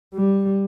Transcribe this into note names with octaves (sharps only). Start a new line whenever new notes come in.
G3